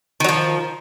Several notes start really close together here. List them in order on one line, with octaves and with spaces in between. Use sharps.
D#3 F#3 F3